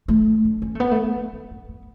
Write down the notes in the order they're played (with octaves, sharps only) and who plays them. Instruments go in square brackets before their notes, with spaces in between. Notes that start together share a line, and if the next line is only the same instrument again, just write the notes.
[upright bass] A3
D4
C#4
A3
B3
A3
B3
D4
C#4
C#4
B3